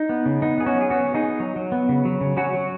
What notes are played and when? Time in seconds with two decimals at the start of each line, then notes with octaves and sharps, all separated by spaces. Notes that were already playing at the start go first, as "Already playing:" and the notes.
Already playing: D#4
0.09 B3
0.26 C#3
0.42 B3 D#4
0.58 B3 G#4
0.67 C#4 F#4
0.75 F#3
0.81 G#4
0.90 B3 C#4 F#4
1.07 B3
1.15 D#4 G#4
1.23 B3
1.40 F#3
1.56 F#3
1.72 B3
1.89 C#3
2.05 F#3
2.21 C#3
2.37 F#3 C#4 F#4
2.53 F#3